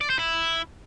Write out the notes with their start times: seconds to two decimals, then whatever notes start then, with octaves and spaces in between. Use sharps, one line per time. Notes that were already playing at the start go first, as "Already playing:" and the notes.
0.01 D5
0.10 C5
0.19 E4